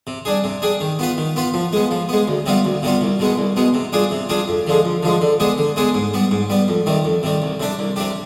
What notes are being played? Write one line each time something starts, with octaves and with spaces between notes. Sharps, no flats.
C3
G3 D4 G#4
C3
G3 D4 G#4
D#3
B3 F4 B4
D#3
B3 F4 B4
F3
G#3 B3
F3
G#3 B3
D2
C3 G3 B3 F4
D2
C3 G3 B3 F4
C2
B2 G#3 B3
C2
B2 G#3 B3
C3
G3 D4 F4 G#4
C3
G3 D4 F4 G#4
F2
D3 F3 G#3
F2
D3 F3 G#3
D3
G#3 B3 D4 G#4
D3
G#3 B3 D4 G#4
G#2
G3 B3
G#2
G3 B3
F2
C3 D#3 G3
F2
C3 D#3 G3
C2
C3 G3 D4 G4
C2
C3 G3 D4 G4